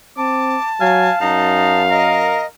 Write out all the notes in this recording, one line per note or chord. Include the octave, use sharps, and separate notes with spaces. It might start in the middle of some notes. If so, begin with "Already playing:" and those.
C4 A5 D6
F#3 F5 G#5
F#2 D#4 F5
A#4 D#5